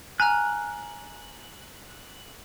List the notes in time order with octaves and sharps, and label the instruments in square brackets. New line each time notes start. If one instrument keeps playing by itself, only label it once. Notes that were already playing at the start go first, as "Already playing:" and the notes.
[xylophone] G#5 A#5 F6 [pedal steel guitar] F#6